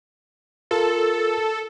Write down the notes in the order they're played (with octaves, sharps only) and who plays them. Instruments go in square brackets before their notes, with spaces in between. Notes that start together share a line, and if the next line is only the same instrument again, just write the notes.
[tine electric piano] F4 A#4 [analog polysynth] A4